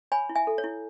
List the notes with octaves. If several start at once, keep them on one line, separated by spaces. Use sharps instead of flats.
C#5 G#5 B5
E4
E5 G#5
A4
C#5
E4